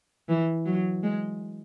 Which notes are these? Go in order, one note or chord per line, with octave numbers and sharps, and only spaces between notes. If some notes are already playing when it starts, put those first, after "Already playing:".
E3
F#3
G#3